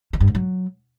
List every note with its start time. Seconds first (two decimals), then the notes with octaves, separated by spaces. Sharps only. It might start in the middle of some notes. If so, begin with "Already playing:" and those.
0.13 D#3
0.20 G2
0.28 G#2
0.35 F#3